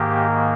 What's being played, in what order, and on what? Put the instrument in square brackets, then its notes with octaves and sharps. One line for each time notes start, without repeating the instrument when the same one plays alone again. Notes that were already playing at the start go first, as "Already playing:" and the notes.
Already playing: [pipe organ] G#2 D#3 A#3 G4